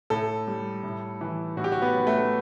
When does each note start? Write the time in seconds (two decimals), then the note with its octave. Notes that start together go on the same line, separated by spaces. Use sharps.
0.10 A2 A4
0.47 G3
0.83 A2
1.21 E3
1.57 A2 F#4
1.64 G4
1.72 F#4
1.82 B3
1.94 F#3
2.07 A3